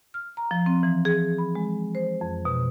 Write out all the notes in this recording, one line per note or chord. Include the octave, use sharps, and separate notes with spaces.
F6
A#5
F3
C4
E3
G#4
B5
G#3
C5
F2
B2